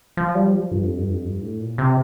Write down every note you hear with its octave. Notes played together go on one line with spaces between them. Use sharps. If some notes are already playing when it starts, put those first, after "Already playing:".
F3
G3
F3
G2
F2
G2
F2
G2
A2
A#2
C3